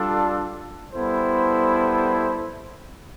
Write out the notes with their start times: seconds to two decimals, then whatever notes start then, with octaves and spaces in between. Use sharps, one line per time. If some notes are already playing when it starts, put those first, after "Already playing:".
Already playing: G3 D4 F4 A4
0.92 G3 B3 E4 A4 C5